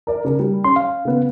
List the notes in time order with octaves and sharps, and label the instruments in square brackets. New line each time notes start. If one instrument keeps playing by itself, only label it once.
[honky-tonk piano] A#4 D5
C#3 A#4
G3
[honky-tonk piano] C#4 [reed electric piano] C6
[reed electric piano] F5
[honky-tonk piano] C#3 B3